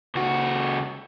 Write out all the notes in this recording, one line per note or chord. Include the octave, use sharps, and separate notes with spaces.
C#2 F#4